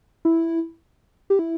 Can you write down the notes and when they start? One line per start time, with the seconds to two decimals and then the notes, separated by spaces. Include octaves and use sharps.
0.25 E4
1.30 G4
1.39 E4